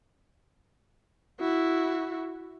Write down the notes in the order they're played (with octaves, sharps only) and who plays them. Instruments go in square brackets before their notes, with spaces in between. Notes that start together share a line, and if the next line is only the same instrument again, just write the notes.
[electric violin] E4 F#4